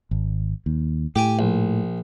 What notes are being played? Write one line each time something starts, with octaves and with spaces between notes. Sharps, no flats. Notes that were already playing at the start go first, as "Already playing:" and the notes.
G#1
D#2
A2 G4 G5 G#5
A#1